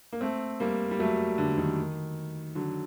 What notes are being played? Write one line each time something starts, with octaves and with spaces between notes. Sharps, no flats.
A#3
A3 C4
G3 A#3
G3
F#3 A3
D3
D#3
D3 F#3